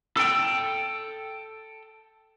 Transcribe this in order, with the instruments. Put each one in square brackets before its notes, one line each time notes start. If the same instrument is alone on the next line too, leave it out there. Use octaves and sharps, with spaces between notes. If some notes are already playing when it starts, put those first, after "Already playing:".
[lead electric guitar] A4 G5